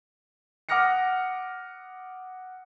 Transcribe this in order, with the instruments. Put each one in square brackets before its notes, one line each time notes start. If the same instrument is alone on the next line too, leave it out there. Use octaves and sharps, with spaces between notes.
[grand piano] F#5 D6 D#6 F6 A#6 C#7